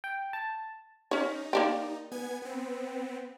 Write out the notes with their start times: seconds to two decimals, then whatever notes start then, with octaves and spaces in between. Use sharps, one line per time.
0.04 G5
0.33 A5
1.11 C#4 D#4 C#5
1.53 A#3 D4 G4
2.12 B3 G#5 G#6
2.42 B3 C4